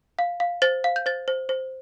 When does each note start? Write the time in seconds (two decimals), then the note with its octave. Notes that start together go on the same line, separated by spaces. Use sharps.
0.19 F5
0.40 F5
0.62 C5 A6
0.84 F5
0.96 G6
1.06 C5 A6
1.28 C5
1.49 C5